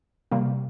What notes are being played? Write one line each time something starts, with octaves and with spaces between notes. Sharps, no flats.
C3 G3 A#3